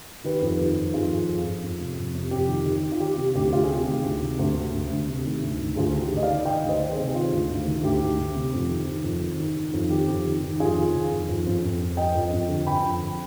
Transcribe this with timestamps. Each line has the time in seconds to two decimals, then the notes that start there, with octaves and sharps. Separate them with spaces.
0.24 D#3 G4 B4
0.41 F2
0.60 D#3
0.77 F2
0.94 F2 F4 G#4
1.12 F2
1.29 F2
1.46 F2
1.62 F2
1.80 C3
1.97 F2
2.15 C3
2.31 F2 G4
2.49 D#3
2.66 D#3
2.83 D#3
2.92 F4
3.00 D#3 G4
3.17 C3 G4
3.35 D2 G4
3.52 D2 F4
3.63 G#4
3.70 C3 G4
3.87 D#3
4.04 D2
4.21 C3
4.39 D2
4.56 D2
4.73 D2
4.90 D2
5.08 C3
5.24 D#3
5.42 D2
5.60 D2
5.76 D2 F4 G#4
5.94 D#3
6.00 G4
6.11 D2
6.17 D#5
6.23 D5 F5
6.28 D#3
6.45 D#3 D#5 G5
6.63 D2
6.69 C5 D#5
6.80 D#3
6.92 G#4 C5
6.98 C3
7.14 D#3 F4
7.32 D2
7.50 D2
7.67 D#3
7.83 D2 G4
8.01 D2
8.19 D2
8.35 C3
8.53 F2
8.71 D#3
8.87 D#3
9.04 F2
9.21 D#3
9.40 D#3
9.57 D#3
9.73 F2
9.90 D#3 G4
10.09 F2
10.26 D#3
10.43 D#3
10.60 F2 F4 G#4
10.76 D#3
10.95 D#3
11.11 F2
11.29 F2
11.46 F2
11.64 F2
11.81 F2
11.97 F3 D#5 G5
12.15 F2
12.32 F2
12.49 D3
12.66 F2 G5 B5
12.84 F2
13.01 F2